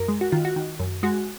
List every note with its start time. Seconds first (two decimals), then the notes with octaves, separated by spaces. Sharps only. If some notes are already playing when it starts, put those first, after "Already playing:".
Already playing: F#2 A#4
0.08 G#3
0.21 F#4
0.32 D#3 F4
0.45 F#4
0.56 D#3
0.79 F#2
1.03 G#3 F#4